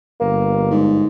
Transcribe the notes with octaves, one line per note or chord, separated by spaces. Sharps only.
G1 A#3
G#2